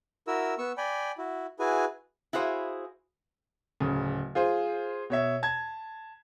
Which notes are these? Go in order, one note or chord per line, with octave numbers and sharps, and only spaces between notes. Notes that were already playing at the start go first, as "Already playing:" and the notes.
E4 F#4 A#4 E6
B3 C#6 E6
D5 G5 G#5 B5
E4 F#4
E4 F#4 G#4 B4 G#5
E4 F#4 G#4 C5 F5
D1 C#3
F4 G#4 C5
B2 C#5 E5
A5 G#6